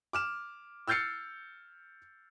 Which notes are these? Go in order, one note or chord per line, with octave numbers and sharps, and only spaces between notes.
D6 F6 E7
E6 F6 G6 A6 C7 C#7